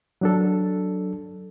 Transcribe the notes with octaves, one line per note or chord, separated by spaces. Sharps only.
F#3 D4 A4